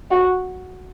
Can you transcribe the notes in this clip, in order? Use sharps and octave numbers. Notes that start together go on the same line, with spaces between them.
F#4